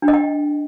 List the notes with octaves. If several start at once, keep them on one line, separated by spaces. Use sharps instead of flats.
D4
D#5
G5